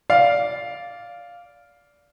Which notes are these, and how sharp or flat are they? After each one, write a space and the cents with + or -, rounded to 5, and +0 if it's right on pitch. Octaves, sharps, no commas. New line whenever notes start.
D5 -15 F5 +0